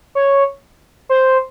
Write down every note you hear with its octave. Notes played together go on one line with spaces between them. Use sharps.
C#5
C5